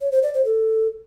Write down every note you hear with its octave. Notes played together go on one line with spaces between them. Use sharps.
C#5
C5
D5
C5
A4